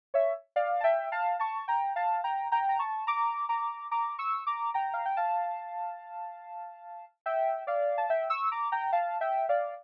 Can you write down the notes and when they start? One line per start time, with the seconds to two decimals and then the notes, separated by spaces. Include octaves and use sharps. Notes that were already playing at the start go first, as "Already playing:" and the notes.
0.14 C#5 E5
0.56 D5 F5
0.80 A5
0.84 E5 G5
1.12 F5 A5
1.39 A5 C#6
1.68 G5 A#5
1.96 F5 A5
2.24 G5 A#5
2.52 G5 A#5
2.69 A#5
2.79 A5 C#6
3.07 A#5 D6
3.49 A#5 D6
3.91 A#5 D6
4.19 C#6 E6
4.47 A#5 D6
4.74 G5 A#5
4.94 F5
5.05 G5
5.17 F5 A5
7.26 E5 G5
7.67 D5 F5
7.98 A5
8.10 E5 G5
8.30 C#6 E6
8.51 A#5 D6
8.72 G5 A#5
8.93 F5 A5
9.21 E5 G5
9.49 D5 F5